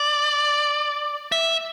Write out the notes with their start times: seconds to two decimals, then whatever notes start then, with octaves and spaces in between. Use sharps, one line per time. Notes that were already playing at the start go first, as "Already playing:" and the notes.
Already playing: D5
1.32 E5